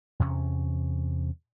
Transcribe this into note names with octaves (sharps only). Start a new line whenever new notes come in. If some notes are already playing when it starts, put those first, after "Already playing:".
E2 C3 C#4